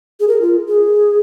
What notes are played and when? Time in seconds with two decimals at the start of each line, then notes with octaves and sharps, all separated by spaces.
0.20 G#4
0.28 A#4
0.42 F4
0.68 G#4